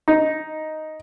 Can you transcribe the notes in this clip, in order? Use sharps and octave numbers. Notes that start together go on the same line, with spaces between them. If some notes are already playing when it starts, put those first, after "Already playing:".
D#4